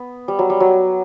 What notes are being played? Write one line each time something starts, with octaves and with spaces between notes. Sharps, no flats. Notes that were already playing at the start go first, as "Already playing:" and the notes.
Already playing: B3
G3
F#3
G3
F#3